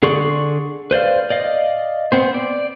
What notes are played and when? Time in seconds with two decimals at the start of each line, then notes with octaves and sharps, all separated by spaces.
0.03 D3 G#4 D5 C6 C#6
0.91 B4 C5 D5 F5
1.30 D5 D#5 F5
2.12 B3 C4 C5
2.34 D5